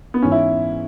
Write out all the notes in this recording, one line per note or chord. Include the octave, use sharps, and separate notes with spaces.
B3
G#2 E3 C#4
E4